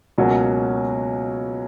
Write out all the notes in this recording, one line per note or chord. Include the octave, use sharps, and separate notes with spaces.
C#2 B2 F#3 A#3 C#4